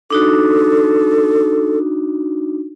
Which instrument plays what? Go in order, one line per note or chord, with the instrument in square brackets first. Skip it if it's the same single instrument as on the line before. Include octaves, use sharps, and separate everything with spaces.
[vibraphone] D4 D#4 F#4 [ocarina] A4